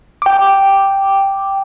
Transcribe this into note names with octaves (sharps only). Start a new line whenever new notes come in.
G5 D6